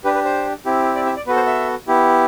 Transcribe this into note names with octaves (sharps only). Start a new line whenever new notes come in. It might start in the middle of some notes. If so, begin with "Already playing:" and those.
D4 G4 B4
B4
C5
C4 E4 G4
D5
E5
D5
B3 F#4 A4 B4
C5
E5
B3 E4 G4